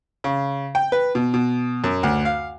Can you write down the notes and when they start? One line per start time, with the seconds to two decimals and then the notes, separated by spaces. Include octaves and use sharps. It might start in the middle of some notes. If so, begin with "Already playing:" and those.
0.24 C#3
0.75 G5
0.92 B4
1.15 B2
1.34 B2
1.84 F#2
2.03 D2
2.25 F5